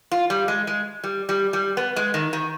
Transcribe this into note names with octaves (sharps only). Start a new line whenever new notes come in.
F4
G3
G#3
G#3
G3
G3
G3
B3
G#3
D#3
D#3